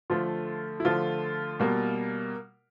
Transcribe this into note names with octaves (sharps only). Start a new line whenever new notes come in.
D3 F3 A3 F4
E4
D3 F3 A3 F4
B2 G3 A#3